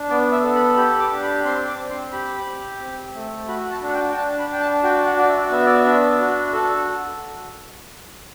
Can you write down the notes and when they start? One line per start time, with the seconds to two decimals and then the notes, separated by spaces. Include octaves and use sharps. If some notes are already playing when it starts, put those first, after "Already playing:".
Already playing: D4
0.10 B3 D5
0.32 E5
0.43 A4
0.55 B5
0.77 G4 B5
0.99 D6
1.11 D4
1.23 B5
1.45 C4 C6
1.68 D6
1.78 C4
1.90 C6
2.12 G4 B5
2.46 G4
2.81 C4
3.15 A3
3.48 F#4 B5
3.71 A5
3.82 D4
3.88 F#5
3.93 G5
4.09 G5
4.16 D4 A5
4.39 B5
4.49 D4 G5
4.60 A5
4.83 F#4 G5
5.06 F#5
5.17 F#4 D5
5.29 E5
5.51 B3 E5
5.66 D5
5.79 E5
5.86 D4
6.19 F#4
6.53 A4